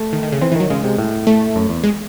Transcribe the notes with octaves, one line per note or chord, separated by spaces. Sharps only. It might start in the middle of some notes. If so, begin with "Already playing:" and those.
Already playing: A3
D#3
D#3
C#3
E3 C4
E3
D#3 F#3
C#3 G#3
C3
A2
A3
F#2
E2
G#3